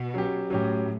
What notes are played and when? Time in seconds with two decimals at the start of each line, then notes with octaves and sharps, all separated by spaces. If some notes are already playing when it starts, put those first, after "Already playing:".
Already playing: B2
0.14 F#3 C#4 G4
0.50 A2 F#3 C#4 G4